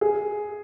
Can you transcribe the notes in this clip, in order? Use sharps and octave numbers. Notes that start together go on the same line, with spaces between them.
G#4